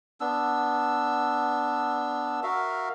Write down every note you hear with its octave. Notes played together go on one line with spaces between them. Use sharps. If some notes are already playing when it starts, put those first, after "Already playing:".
B3 D4 E6
F#4 A#4 E5 F5